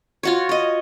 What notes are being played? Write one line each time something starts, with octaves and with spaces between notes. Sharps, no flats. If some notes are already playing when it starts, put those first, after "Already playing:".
F4 F#4 C#5
C#5 D#5